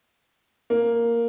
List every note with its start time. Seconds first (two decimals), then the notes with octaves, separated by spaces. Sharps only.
0.70 A#3